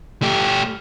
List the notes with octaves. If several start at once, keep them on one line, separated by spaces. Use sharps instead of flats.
A3 G4